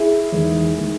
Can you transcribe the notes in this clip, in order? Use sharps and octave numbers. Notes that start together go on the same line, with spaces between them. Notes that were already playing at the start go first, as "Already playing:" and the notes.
Already playing: E4 G#4
E2 D#3 G#3
D#3 G#3